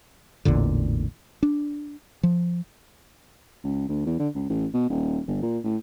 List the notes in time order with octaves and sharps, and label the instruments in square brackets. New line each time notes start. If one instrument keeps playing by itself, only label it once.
[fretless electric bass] A1 E2 A#2 D3
D4
F3
[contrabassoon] C#2
D2
E2
D3
C#2
A1
B2
D#1
G1
A#2
A2